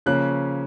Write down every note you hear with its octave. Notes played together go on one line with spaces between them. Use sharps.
C#3 F3 A#3 C#4 F#6